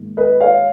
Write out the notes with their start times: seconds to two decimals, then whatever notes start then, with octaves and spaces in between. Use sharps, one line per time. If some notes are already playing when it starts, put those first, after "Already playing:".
Already playing: G#2 D#3 A#3
0.17 B4 D#5
0.41 C#5 F5